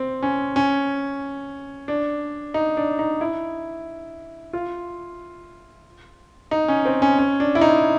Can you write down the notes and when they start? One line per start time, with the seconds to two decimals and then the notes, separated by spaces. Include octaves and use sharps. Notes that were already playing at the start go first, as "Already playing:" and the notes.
Already playing: C4
0.23 C#4
0.56 C#4
1.88 D4
2.54 D#4
2.77 D4
2.99 D#4
3.21 E4
4.53 F4
6.51 D#4
6.68 C#4
6.85 C4
7.02 C#4
7.19 C#4
7.40 D4
7.55 E4
7.61 D#4